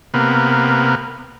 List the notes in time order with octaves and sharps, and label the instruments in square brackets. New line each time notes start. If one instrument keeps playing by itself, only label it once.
[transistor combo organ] C3 A#3 B3